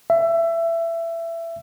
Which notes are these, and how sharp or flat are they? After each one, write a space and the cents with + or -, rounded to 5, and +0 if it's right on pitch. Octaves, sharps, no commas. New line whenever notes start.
E5 +20